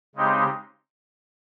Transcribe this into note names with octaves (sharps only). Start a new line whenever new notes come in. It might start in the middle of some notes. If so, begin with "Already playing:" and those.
C#3 G#3 C4 D#4 G4